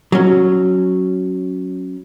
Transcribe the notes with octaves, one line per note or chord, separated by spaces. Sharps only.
F#3 C#4